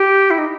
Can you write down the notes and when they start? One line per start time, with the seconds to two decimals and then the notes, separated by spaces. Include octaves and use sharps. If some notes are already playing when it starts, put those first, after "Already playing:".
Already playing: G4
0.31 E4
0.38 D#4